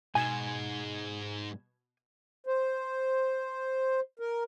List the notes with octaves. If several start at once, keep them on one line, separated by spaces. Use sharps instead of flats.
G#2 B2 G#5 G#6 E7
C5
A#4